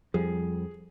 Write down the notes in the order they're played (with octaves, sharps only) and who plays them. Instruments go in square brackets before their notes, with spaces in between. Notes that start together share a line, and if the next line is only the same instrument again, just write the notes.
[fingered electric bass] F2 G3 [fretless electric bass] F3 [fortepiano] G#4